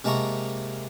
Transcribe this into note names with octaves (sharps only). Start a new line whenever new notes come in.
C3 G#3 A#3 A5 A#5 C#6